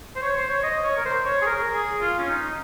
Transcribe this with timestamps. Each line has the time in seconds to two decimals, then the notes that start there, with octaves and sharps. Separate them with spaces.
0.16 C5
0.22 C#5
0.37 C5
0.50 C#5
0.63 D#5
0.83 C#5
0.97 A#4
1.05 C5
1.25 C#5
1.42 G#4
1.46 A#4
1.74 G#4
2.01 F4
2.19 C#4
2.29 D#4